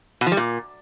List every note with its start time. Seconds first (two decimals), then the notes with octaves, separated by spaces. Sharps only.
0.21 B2
0.26 F3
0.32 G3
0.37 A#2